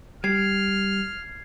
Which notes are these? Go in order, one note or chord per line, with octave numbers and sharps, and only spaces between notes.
G3 F6 G#6 C7